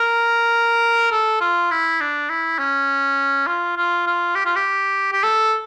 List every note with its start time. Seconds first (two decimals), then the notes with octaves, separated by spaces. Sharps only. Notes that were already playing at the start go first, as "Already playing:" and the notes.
Already playing: A#4
1.11 A4
1.41 F4
1.71 E4
2.01 D4
2.29 E4
2.58 C#4
3.47 F4
3.77 F4
4.07 F4
4.35 G4
4.46 F4
4.56 G4
5.12 G4
5.24 A4